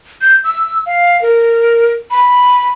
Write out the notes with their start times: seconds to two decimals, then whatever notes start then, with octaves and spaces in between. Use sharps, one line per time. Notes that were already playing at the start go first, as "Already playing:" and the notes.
0.21 G6
0.44 E6
0.86 F5
1.22 A#4
2.11 B5